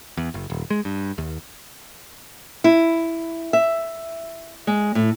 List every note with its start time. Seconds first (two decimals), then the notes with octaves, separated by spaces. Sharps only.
0.17 E2
0.34 F#1
0.50 D#1
0.70 G#3
0.85 G2
1.18 D#2
2.64 E4
3.53 E5
4.67 G#3
4.95 A2